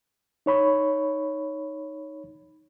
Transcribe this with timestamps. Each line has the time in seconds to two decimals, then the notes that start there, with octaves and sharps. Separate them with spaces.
0.46 D#4 C#5 B5 C#6